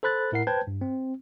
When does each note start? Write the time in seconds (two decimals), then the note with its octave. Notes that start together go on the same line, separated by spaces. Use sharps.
0.03 A4 C5 B5 F#6 A6
0.32 A2 E4 A#4 F#5 C7
0.47 B4 C5 G5 A5 G6 G#6
0.67 G2
0.81 C4